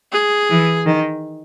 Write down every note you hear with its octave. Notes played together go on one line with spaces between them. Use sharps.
G#4
E3
D#3